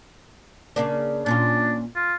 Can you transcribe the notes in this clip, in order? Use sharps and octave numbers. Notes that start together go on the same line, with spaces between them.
C#3 A#3 D4
A#2 C#4 D4 F4
F4